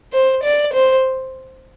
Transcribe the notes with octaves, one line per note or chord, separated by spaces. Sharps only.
C5
D5
C5